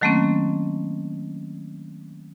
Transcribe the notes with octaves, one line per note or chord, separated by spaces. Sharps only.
D#3 F#3 A3 A#3 C4 C#4